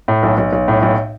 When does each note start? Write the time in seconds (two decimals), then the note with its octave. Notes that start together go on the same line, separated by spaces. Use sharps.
0.08 A2
0.23 B1
0.38 B1
0.53 B1
0.68 A2
0.83 B1